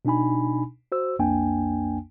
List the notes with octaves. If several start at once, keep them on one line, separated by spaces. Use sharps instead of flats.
B2 D4 D#4 G#5 B5
F#4 C5 E6
B1 F2 A#3 D4 G5 G#5